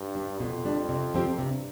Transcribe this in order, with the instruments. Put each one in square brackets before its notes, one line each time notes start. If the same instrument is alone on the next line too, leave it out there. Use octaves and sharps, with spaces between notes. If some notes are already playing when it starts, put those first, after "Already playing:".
Already playing: [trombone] G2
[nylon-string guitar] G3 D4
[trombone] F2 [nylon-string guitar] B2
[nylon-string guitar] G3 D4
C3
F3 C4 G4
[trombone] G2 [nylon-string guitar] C3